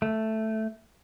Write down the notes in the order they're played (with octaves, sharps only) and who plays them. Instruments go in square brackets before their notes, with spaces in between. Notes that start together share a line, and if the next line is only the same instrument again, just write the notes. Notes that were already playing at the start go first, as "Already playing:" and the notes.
[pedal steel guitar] A3